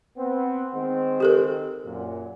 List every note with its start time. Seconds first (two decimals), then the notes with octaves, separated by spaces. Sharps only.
0.17 B3 C4
0.74 D#3 G#3 C4
1.20 G4 A4 A#4
1.84 F#2 A#2